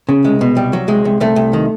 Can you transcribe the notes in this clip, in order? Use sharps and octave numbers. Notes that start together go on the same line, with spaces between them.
C#3
C2 G#3
B2
C2 G3
F#3
C2 G#3
C2
C2 A3
C2
D#3